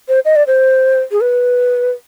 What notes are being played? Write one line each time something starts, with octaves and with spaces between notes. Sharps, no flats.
C5
D#5
D5
C5
G#4
B4